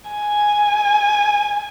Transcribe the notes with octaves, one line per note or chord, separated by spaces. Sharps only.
G#5